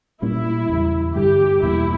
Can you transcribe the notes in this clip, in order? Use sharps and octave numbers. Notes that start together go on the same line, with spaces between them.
A#2 G3 A#3 C#4 E4
E2 C#3 G3
G2 D3 G3 G4
E2 B2 G3 A#3 E4